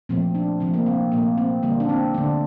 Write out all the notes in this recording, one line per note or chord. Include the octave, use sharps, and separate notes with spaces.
A#2 F3 A3 C4
D4
C3 F3 A3 C4
A#3
C4
A#2 F3 A3 A#3
C4
D3 G3 A#3
D4
C4
D3 A3 D4